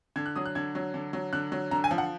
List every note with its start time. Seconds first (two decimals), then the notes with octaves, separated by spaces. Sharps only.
0.16 D3 G#6
0.26 F#6
0.36 F#3 D#6
0.46 F#6
0.55 D3 G#6
0.75 F#3
0.94 D3
1.13 F#3
1.33 D3 F#6
1.52 F#3
1.71 D3 A#5
1.84 G#5
1.91 F3
1.98 F#5